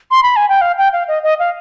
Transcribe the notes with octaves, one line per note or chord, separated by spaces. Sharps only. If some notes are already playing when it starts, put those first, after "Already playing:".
C6
B5
G#5
G5
F5
G5
F5
D#5
D#5
F5